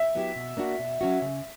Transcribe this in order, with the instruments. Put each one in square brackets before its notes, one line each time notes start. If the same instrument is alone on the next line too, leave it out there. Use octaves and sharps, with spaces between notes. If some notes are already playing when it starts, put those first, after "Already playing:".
Already playing: [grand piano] E5
[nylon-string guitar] F#3 B3 E4 G4
B2
A#3 D4 F#4
B2
F#3 C#4 F#4
C#3